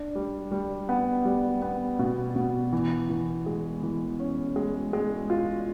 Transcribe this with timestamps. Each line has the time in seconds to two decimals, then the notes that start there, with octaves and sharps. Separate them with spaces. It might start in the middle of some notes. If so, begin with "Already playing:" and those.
Already playing: D4
0.15 G3
0.52 G3
0.89 B3
1.25 G3
1.62 B3
1.99 B2
2.36 B2
2.73 E3
3.09 E3
3.46 G#3
3.83 E3
4.20 C#4
4.56 G#3
4.93 G#3
5.30 F4